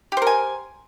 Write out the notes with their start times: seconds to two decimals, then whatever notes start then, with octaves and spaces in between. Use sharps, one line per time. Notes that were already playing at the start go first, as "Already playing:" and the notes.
0.12 G4
0.17 C5
0.22 A#4
0.27 G#5